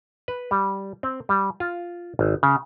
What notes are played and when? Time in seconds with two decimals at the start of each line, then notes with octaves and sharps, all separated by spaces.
0.28 B4
0.51 G3
1.03 C4
1.29 G3
1.60 F4
2.19 G#1
2.43 C#3